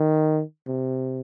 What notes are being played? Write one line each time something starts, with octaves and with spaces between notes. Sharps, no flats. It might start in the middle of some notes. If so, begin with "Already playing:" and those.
Already playing: D#3
C3